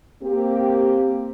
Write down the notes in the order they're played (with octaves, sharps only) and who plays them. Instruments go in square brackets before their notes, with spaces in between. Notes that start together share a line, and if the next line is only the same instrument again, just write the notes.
[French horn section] A#3 C4 G4